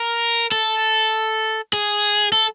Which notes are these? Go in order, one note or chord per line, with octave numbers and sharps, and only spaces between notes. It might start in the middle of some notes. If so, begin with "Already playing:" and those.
Already playing: A#4
A4
G#4
A4